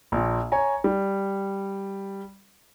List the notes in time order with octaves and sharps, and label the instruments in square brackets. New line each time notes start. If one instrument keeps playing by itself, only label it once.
[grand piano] A#1 A#2
C#5 G#5 A#5
G3